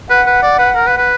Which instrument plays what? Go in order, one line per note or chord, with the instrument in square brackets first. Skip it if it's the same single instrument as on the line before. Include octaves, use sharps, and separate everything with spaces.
[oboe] B4 [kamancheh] F#5
[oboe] B4
D5
B4
A#4
B4
B4